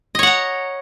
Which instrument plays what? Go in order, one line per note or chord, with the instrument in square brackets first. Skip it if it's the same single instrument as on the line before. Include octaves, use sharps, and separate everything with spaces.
[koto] D#5
C#5
F#5
A#5